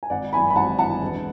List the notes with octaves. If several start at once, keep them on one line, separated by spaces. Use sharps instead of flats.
G#5
G#1 D5 F#5
F#2 E3 G#5 B5
B5
G#1 F#5 A5
F#2 E3 F#5 A5
E1